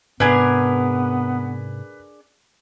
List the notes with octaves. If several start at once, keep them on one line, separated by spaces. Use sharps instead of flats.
G#2 C3 B3 D4 G#4 A#4 B4